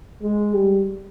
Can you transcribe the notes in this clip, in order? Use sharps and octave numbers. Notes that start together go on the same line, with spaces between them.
G#3
G3